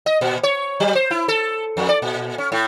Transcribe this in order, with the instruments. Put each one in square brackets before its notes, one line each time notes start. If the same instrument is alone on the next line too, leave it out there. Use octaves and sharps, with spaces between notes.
[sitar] D#5
A#2
C#5
F#3
C5
E4
A4
F2
D5
A#2
C#4
A2